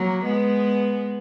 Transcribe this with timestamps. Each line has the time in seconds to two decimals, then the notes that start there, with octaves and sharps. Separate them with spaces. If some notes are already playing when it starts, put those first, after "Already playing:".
Already playing: F#3 A#3
0.24 G#3 B3